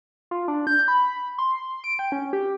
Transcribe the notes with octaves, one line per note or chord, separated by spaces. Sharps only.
F4
D4
G6
B5
C6
D7
G5
C#4
G4